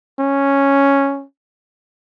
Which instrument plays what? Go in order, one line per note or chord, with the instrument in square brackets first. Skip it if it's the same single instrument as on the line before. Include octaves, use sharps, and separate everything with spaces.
[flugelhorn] C#4